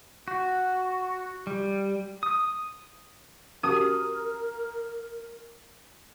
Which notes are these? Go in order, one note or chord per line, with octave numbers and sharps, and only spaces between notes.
F#4
G3
D#6
C#4 F#4 G4 A#4 D#6